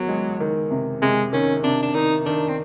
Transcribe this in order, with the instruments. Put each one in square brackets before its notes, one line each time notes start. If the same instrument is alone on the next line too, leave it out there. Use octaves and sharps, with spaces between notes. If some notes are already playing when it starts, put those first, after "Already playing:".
Already playing: [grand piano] E2 D#3 [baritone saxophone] F#3
[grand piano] G#3
D#3
C3
[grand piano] C3 [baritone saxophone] G#3
[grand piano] D#3 [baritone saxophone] C#4
[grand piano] C3 [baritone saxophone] D4
[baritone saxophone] D4
[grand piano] D#3 [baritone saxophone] D#4
[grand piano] D#3 [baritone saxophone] D4
[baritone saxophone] C4